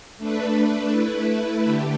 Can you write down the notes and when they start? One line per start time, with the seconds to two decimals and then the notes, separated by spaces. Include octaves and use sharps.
0.17 A3 D4 B4
0.91 A3 E4 B4
1.64 D3 A3 G4